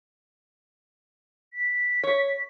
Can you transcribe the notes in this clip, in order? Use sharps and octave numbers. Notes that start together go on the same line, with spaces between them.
B6
C#5